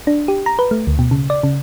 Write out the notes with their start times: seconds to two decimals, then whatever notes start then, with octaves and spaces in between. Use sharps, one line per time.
0.07 D4
0.28 G4
0.46 A#5
0.59 B4
0.71 A3
0.87 D2
0.99 B2
1.11 C#3
1.30 D5
1.43 C#3